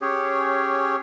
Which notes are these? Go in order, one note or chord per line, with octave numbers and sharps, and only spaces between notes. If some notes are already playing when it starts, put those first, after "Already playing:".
C#4 G4 G#4 C#5